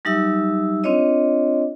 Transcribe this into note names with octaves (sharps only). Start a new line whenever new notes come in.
F#3 G3 D#4 G4 E5 E6
C4 D4 F4 C#5 D#5